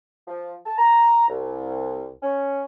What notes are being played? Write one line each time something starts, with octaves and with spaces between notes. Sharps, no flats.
F3
A5
A#5
C2
C#4